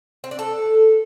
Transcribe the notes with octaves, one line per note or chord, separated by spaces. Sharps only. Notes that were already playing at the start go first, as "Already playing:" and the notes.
C4
D4
A4